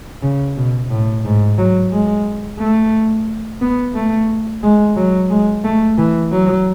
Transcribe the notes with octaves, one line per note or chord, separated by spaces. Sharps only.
C#3
B2
A2
G#2
F#3
G#3
A3
B3
A3
G#3
F#3
G#3
A3
E3
F#3